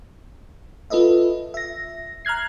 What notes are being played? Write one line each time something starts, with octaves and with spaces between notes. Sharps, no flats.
F4 A4 B4 D#5 E5
E5 A#6
A#5 F6 F#6 G#6 C7